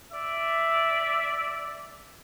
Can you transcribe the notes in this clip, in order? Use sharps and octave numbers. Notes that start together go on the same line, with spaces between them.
D5 E5